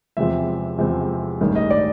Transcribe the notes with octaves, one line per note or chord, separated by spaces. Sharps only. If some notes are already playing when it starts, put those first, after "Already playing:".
E2 C3 F3 G#3 C4 E5
E2 C3 F3 G#3 C4
A1 G2 D#3 G#3
D#5
D5